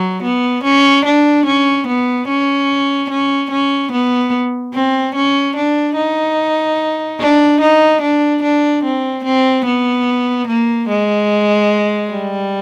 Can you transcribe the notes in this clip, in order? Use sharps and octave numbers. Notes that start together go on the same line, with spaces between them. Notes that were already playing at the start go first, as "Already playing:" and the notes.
Already playing: F#3
B3
C#4
D4
C#4
B3
C#4
C#4
C#4
B3
C4
C#4
D4
D#4
D4
D#4
D4
D4
C4
C4
B3
A#3
G#3
G3